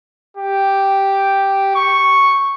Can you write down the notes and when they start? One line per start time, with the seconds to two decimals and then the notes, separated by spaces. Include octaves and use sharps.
0.37 G4
1.75 C#6